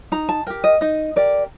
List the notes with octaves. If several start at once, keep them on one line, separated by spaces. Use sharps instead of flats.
D#4 A#5
A5
G4 A#4 G5
D#5
D#4 D#5
G4 A#4 D5